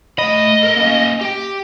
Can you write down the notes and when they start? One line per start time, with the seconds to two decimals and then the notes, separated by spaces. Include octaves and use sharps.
0.18 A3 D#5 B5
0.63 A4 A#4
0.76 A#3 C#4
1.21 G4 G5